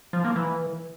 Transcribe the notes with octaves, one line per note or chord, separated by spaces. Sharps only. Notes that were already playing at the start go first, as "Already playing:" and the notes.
F3
A#3
E3